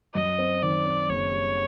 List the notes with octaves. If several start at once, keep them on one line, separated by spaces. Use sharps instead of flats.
F#2 D#5
C4
D#3 D5
C4
F#1 C#5
G3